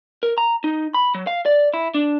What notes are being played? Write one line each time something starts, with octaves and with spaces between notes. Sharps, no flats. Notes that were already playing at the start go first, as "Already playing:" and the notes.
A#4
A#5
D#4
B5
F#3
F5
D5
E4
D4